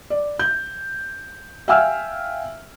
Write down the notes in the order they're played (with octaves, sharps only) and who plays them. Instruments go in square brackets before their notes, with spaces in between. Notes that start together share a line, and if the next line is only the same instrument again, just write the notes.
[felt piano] D5
G6
E5 F5 G5 G#5 E6 F6